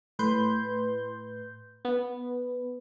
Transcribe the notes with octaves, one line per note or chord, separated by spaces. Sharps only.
A2 B4 C6 G6
B3